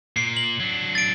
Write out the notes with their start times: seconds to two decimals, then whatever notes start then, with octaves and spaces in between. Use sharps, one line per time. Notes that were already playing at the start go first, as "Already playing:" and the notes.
0.17 A#2 C7
0.36 F#7
0.60 F#3 D4
0.95 A6 D7